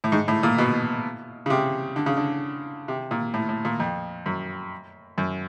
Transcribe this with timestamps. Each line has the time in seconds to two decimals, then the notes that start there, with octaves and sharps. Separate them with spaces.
0.04 A2
0.12 G#2
0.28 A2
0.43 A#2
0.58 B2
1.46 C#3
1.50 C3
1.96 D3
2.06 C#3
2.17 D3
2.88 C3
3.11 A#2
3.34 A2
3.49 A2
3.65 A#2
3.80 F2
4.26 F#2
5.18 F#2